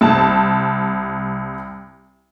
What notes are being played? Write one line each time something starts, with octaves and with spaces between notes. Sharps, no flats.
C2 A5